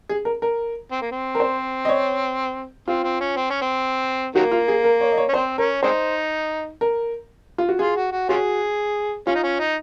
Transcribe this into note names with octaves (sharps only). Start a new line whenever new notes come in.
G#4
A#4
A#4
C4
A#3
C4
A#4
C5
D#5
C#5
C4 F4
C4
C#4
C4
C#4
C4
D#3 F#3 A#3 F#4
F4
G#4
A#4
C#5
D#5
C#5
C#4
C4 C5
C#4 A#4
G#3 C4 D#4 C5
A#4
F4
F#4
F4 G#4
F#4
F#4
C#4 F4 F#4 G#4
C#4 F4
D#4
C#4
D#4